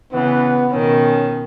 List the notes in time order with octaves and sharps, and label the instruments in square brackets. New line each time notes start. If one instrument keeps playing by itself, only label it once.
[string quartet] C#3 E3 [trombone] B3
[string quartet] B2 D#3 [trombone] C#4